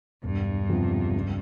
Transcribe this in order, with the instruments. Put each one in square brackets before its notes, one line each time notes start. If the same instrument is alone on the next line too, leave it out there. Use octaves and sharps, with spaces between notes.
[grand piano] E1 [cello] G2
[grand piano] E2 C3 F3
C#2